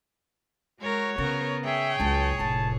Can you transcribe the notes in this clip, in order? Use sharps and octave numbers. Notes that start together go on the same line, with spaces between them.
G#3 F#4 A#4 C#5
C#3 B3 A#4
G#4 C#5 E5 G5
C#2 F#3 A5
F1 A2 A5